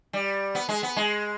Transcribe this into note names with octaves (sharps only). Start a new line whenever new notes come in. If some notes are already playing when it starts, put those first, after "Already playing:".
G3
B3
G#3
B3
G#3